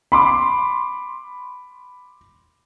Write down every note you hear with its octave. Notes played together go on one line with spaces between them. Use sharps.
B5 C6 D6